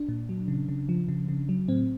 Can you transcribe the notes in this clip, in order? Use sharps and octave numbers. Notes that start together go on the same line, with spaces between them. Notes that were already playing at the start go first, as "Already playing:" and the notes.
Already playing: D4
A#2
F#3
C#3
C#3
F3
C#3
C#3
F#3
A2 C4